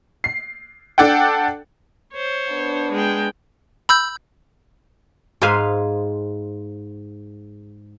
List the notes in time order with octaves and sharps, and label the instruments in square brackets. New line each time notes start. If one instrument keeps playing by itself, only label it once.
[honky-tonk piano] C7
D4 A4 F#5 G5
[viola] C5 C#5
[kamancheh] B3 D4
[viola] G#3 G5
[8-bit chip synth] B5 E6 G6
[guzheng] G#2 G#4 B4 C5 F5 G#5